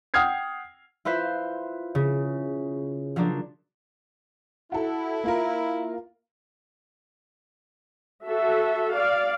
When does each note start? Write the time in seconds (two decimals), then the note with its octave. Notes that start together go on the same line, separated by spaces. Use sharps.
0.14 F#5 G5 D#6 F6 G#6 C7
1.05 E4 F4 B4 C5 E5
1.95 C#3
3.16 F3 F#3 A#3 D4
4.72 E4 F#4 A4
5.24 A#3 F4 A#4
8.24 F#4 A4 E5
8.93 D5 F5